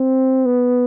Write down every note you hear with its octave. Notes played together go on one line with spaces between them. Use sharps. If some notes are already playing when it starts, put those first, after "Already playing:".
Already playing: C4
B3